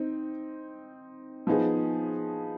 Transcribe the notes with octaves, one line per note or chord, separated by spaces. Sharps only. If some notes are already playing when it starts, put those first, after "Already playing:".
Already playing: C4 D#4
F3 B3 D#4 G#4